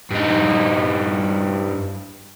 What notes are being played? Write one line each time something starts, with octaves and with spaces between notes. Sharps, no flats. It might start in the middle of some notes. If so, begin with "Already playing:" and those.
G2 D#4